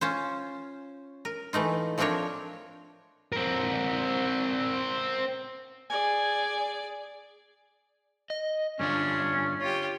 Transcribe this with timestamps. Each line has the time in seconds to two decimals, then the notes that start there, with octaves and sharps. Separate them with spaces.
0.01 C#4 F4 C5
1.25 A#4
1.53 E3 A3 D#4 F4
1.98 F3 A3 C4 D4 A#4 C#5
3.32 C4 A#4
5.90 G#4 D5 G#5
8.30 D#5
8.80 G2 D3 C#4 D4 F4
9.60 F4 G4 C#5